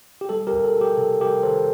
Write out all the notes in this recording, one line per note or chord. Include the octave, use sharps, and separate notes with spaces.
G4
G3 A4
G4 A#4
D2
A4
G3
G4
C3 A4
G3 G4 A#4
D#3 A4 C5